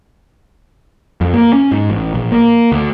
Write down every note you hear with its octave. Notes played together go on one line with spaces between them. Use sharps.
F2
A#3
C#4
G#2
A1
A#1
A#3
D2